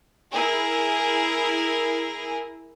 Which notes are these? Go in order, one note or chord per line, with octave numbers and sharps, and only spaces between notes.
E4 G#4 A#4